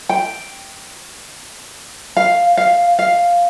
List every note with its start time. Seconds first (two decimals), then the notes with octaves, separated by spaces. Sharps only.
0.09 G5
2.17 F5
2.57 F5
2.99 F5